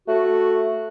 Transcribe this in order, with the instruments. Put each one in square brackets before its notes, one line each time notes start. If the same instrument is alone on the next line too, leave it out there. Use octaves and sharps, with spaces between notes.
[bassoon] A3 [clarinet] F#4